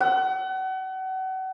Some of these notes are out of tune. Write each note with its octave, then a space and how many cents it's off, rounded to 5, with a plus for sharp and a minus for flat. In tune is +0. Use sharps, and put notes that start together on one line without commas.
F#5 +35